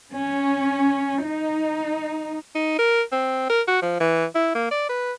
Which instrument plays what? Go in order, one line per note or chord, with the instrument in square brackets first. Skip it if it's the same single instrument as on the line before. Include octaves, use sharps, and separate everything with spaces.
[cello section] C#4
D#4
[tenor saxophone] D#4
A#4
C4
A#4
F#4
F3
E3
E4
A#3
D5
B4